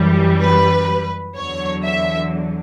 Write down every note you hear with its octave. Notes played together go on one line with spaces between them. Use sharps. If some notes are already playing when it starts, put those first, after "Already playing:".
Already playing: F#2 E3 G3
B4
E2 D3 F#3 C#5
E5